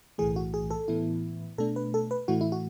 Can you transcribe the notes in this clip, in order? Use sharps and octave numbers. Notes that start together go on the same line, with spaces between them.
B1 A2 E3 A3 G#4
F#4
G#4
A4
A2 E3 B3 E4
B2 A3 D4 A4
B4
A4
B4
A2 E3 A3 E4 F#4
E4
F#4